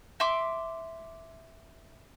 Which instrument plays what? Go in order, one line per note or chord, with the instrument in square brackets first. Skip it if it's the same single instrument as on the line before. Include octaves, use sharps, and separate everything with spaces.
[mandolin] E5 C6 D6